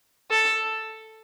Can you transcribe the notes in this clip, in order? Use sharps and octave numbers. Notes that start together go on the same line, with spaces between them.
A4